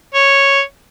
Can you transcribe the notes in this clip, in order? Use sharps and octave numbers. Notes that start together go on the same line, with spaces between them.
C#5